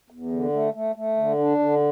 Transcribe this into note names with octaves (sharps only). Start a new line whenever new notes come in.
E2
D3
A3
A3
A3
D3
D4
D3